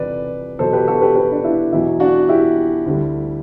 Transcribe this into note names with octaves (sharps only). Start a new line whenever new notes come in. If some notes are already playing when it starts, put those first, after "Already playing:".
Already playing: E2 C3 G3 B4 D5
E2 B2 F#3 A4 C5
G4 B4
F#4 A4
G4 B4
G4 B4
D4
E4
E2 B2 F#3 E4
D4 F#4
E4 G4
D2 D3 G3